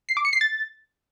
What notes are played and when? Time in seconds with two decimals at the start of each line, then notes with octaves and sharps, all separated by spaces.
0.09 C7
0.17 D6
0.25 C#7
0.33 C7
0.41 A6